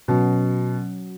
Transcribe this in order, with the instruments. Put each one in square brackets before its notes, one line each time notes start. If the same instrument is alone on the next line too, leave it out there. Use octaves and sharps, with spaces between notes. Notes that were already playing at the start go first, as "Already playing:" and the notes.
[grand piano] B2 [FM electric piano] F#3 C#4 F#4